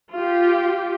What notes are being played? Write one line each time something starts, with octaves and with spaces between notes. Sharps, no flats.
F4 G4